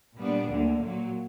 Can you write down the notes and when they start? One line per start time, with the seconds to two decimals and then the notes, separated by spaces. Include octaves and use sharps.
0.18 A#2 G3 B3 D4
0.48 D2 D3 A#3
0.79 A#2 F#3 A#3